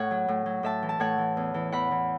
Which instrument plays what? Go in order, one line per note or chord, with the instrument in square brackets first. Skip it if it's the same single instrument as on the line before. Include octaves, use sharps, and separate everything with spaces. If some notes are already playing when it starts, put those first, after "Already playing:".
Already playing: [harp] A2 C#5 F#5
F#3
A2
F#3
A2 E5 A5
E3
A5
A2 C#5 F#5
E3
E2
E3
E2 F#5 B5
E3